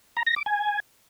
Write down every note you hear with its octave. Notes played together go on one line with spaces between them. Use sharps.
A#5
A#6
D6
G#5